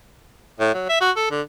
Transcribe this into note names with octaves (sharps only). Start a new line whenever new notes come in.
A2
F#3
E5
F#4
A4
D3